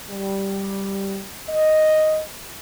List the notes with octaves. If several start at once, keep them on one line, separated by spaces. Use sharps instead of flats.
G3
D#5